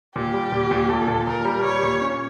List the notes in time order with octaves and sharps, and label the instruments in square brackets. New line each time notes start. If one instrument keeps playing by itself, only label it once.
[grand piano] A#2 [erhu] G4
[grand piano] G3
A#2
A#2
[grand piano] A#2 [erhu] A4
[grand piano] A#2
[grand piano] A#2 [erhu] A#4
[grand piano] G3
[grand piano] G3 [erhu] C#5
[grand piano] A#2
C#4